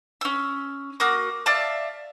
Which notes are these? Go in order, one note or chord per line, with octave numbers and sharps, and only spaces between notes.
C#4 E6
A#3 F#4 D#6
D5 E5 F5 A5